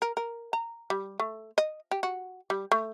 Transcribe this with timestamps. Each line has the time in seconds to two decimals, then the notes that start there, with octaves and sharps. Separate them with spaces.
0.02 A#4
0.17 A#4
0.53 A#5
0.90 G3
1.20 A3
1.58 D#5
1.91 G4
2.03 F#4
2.50 G3
2.72 A3